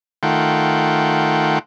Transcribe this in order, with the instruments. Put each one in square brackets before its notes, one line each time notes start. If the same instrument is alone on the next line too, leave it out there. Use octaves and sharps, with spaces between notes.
[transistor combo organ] D#3 A3 F4 F#5 G5